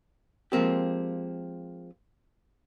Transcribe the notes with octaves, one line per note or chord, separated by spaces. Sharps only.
F3 G#3 A#3 C4 G4